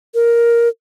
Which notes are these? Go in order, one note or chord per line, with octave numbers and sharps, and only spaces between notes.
A#4